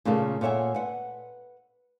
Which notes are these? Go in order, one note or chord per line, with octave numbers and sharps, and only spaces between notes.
A#2 C#3 A3 A#3 A4
A#2 A4 C#5 E5 F#5 G#5
B4 F#5